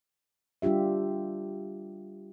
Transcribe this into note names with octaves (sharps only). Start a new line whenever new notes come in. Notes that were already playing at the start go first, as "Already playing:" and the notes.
G3 D4 F4 G4 E5